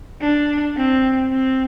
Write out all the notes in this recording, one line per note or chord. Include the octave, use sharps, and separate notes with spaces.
D4
C4
C4